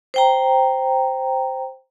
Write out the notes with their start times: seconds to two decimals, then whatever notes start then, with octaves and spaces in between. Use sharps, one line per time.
0.14 C5 G5 A#5